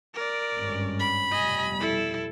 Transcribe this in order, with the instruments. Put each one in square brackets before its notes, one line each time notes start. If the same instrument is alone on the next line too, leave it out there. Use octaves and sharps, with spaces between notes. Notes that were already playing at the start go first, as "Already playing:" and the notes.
[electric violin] A#4 D5
[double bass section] G#1 G2 C#4
[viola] B5
[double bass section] F1 B2 G3 [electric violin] D#5 G#5
[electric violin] E4 A4